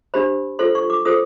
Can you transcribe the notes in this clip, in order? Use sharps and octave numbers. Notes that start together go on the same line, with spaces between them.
D4 G4 C5 B5
F4 A4 C5 C6
C#6
D6
F4 A4 C5 D#6